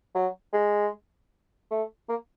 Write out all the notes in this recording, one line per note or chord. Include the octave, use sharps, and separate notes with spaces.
F#3
G#3
A3
A#3